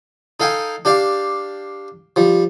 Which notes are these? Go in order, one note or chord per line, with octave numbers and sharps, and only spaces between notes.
D#4 A4 F5 G5 G#5
D4 G4 D5 F5
F3 G3